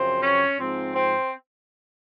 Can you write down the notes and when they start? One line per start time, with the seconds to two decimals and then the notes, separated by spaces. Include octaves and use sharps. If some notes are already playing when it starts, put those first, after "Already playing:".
Already playing: F#2 C#3 F3 C4 C5
0.23 C#4 C#5
0.59 G#2 F3 C4
0.95 C4 C5